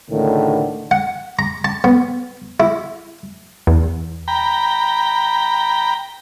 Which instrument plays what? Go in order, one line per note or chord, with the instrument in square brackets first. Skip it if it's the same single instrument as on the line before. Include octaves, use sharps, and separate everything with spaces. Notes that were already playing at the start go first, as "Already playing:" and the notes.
[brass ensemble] C#2 A2 D3 D#3
[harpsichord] F#5
A#5
A5
B3
E4
[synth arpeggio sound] E2
[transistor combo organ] G5 A#5 B5